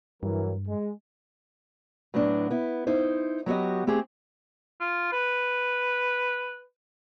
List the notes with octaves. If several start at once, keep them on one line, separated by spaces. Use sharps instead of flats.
G2 E3 F#3 A#4
G#3
A2 F#3 B3 D4
B3 E4
D#4 E4 C5
F#3 B3 F#4 G4 D#5
A3 C4 G4 G#4
F4
B4